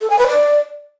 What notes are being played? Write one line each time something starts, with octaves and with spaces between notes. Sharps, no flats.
A4
G#5
B4
D5